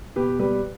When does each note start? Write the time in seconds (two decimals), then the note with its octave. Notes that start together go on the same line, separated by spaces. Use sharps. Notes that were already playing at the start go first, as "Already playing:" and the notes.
0.16 B2 G4 B4
0.39 G3 G4 B4